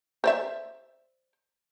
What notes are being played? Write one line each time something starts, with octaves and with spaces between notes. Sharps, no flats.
C5 D5 E5